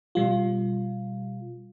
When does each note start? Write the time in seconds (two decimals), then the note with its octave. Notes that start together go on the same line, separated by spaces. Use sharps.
0.15 B2 G3 F4